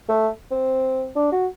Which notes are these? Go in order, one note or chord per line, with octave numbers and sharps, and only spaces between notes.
A3
C4
D4
F#4